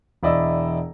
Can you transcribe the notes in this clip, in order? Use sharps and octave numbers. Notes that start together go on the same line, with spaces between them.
E1 E4 D5 D#5 E6